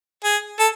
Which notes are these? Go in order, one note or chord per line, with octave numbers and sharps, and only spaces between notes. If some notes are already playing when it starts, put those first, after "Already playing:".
G#4
A4